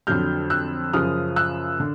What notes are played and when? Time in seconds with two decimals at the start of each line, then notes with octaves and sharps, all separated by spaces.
0.07 F2 D3 F#3 F6 G6
0.50 E6 F#6
0.93 F#2 C#3 F3 D#6 F6
1.36 E6 F#6
1.80 D3